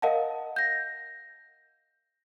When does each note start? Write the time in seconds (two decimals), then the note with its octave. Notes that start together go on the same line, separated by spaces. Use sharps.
0.02 A#4 D#5 F5 F#5 A5
0.56 G6 A#6